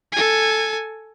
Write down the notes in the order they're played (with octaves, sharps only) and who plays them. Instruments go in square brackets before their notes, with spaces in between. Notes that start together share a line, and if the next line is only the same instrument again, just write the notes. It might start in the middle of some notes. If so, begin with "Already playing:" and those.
[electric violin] A4 G#5